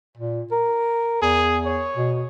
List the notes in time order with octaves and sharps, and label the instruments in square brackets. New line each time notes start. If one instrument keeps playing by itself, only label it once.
[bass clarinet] A#2
A#4
[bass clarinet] E2 [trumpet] G#4
[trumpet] C#5
[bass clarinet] B2